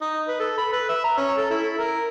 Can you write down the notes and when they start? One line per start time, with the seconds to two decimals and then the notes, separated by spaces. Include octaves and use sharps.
0.01 D#4
0.28 B4
0.40 A4
0.58 B5
0.72 B4
0.89 E5
1.04 A#5
1.17 C#4
1.37 A4
1.50 E4
1.78 A#4